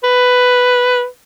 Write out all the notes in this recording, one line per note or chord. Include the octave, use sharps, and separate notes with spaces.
B4